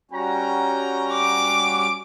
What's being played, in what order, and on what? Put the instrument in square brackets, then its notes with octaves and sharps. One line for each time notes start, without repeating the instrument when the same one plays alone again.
[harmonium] G3 C#4 F#4 [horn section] C#5 G5 A#5
[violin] D6